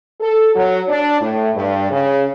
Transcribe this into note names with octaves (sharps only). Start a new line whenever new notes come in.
A4
F#3
D4
A2
G2
C#3